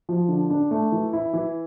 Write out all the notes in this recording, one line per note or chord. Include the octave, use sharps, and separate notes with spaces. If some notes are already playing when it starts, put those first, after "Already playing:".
F3
D3
D4
A3
E3
E4
E3